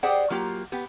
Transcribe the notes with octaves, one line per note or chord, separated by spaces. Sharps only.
G4 G#4 C5 D5 F#5 G5
F#3 A#3 F4 G4
B3 G4